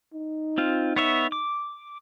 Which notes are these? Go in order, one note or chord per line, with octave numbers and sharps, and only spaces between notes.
D#4
C4 F4
B3 C#5 E5
D6